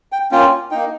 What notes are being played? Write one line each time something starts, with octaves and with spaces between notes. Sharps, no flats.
G5
A#3 C#4 F4 G5
A#3 D#4 G5